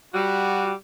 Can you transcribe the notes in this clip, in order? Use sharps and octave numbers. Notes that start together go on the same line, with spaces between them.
G3 F#4